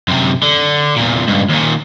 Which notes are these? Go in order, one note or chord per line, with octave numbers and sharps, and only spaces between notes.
F#2 C3
D3
E2 A#2
C#2 G2
D#2 A#2